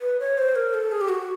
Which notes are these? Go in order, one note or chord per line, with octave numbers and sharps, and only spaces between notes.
B4
C#5
C5
A#4
A4
G#4
G4
F#4